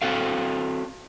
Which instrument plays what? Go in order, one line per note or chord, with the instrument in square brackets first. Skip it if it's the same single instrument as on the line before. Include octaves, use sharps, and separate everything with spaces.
[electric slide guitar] C4 F#4 A4 F5